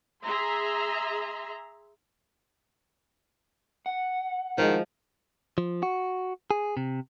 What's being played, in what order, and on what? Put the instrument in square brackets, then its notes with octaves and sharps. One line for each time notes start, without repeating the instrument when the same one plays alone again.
[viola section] G#4 E5 A#5 C6
[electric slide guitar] F#5
[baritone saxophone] D#3 [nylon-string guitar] F3 G#3
[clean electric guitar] F3
F#4
G#4
C3